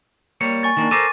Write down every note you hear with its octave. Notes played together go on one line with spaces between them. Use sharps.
G3 A#3 C#5
G#5 C#6 A6
D#3 A#3 D4
A4 A#4 C5 D6 A6 D#7